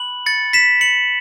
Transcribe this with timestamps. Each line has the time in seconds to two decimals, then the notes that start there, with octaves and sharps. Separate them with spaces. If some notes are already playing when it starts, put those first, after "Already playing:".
Already playing: B5 F#6 F#7
0.26 A6 C#7
0.53 B6 E7
0.81 C#7 F#7